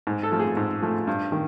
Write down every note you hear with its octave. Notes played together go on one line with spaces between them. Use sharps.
G#2
A4
F3 A3
G#4
G#2
F3 A3
G2
D#3